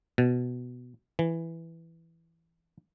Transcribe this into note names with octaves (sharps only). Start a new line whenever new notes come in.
B2
E3